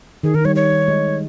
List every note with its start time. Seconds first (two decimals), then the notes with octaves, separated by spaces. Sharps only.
0.23 D#3 G#4
0.35 D#3 A#4
0.45 G3 C#5
0.56 C#5
0.88 G#3